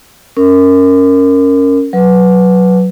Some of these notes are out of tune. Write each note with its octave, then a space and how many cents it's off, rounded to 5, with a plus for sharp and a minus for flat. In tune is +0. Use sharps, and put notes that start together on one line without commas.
C#4 +0 A#4 -15
F#3 +0 B4 +0